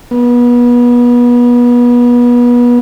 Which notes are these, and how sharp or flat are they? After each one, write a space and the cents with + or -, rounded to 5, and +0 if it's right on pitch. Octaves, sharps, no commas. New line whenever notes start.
B3 -30